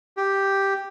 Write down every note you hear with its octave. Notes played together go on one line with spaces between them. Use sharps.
G4